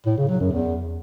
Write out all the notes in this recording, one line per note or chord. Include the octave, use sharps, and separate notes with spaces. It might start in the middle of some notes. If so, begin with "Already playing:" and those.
A2
C#3
F#3
F#2
E2